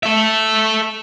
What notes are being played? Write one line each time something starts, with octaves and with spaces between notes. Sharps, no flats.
A4 E5